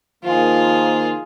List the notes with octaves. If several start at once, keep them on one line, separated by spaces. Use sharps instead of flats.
D#3 F3 A#3 F4 G#4